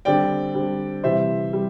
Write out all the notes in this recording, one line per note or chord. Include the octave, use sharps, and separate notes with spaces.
D3 G3 C4 D5 G5
D3 G3 C4
C3 E3 G3 C5 E5
G3